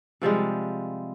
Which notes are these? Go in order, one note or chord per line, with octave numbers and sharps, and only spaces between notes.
C3 F3 G3 G#3